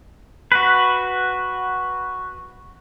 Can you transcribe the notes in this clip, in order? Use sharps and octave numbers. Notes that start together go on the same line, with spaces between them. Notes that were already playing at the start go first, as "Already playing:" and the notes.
F#4 B4